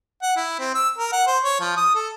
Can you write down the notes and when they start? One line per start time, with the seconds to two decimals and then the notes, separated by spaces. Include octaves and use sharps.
0.22 F#5
0.37 E4
0.59 C4
0.75 E6
0.98 A#4
1.13 F#5
1.27 C5
1.44 C#5
1.61 F3
1.77 D#6
1.95 A4